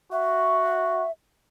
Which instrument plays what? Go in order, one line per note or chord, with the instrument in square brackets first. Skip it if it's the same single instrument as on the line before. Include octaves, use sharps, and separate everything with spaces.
[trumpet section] F#4 [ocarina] E5